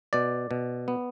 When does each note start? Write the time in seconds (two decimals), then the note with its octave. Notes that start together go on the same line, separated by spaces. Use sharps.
0.13 B2 D5
0.51 B2
0.88 B3